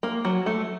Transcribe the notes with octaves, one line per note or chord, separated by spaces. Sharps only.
A#3
F#3
A3